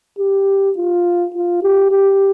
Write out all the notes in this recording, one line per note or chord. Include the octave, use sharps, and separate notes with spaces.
G4
F4
F4
G4
G4